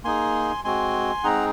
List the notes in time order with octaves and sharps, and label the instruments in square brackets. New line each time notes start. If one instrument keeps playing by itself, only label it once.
[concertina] A#3 D#4 G#4 G#5 C6
G#3 C4 F#4 G#5 C6
G#3 C4 D#4 G#4 F#5 A#5